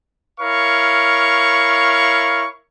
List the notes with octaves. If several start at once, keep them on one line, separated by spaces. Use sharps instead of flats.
E4 A#4 C#5 F5 C#6